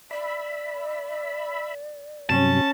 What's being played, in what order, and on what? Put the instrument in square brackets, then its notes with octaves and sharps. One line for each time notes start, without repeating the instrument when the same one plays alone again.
[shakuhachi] D5 [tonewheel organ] E5 B5
[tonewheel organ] G2 C3 F#3 [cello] C#4 [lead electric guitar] A5